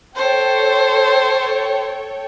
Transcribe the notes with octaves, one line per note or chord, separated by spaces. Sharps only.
A4 C5 C#5 G5